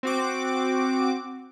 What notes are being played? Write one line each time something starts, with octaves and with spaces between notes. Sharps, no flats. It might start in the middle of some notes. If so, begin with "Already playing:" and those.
C4 F#4 D6